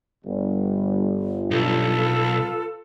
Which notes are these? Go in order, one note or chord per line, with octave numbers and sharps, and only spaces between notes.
G1
B1 F4 A4 B4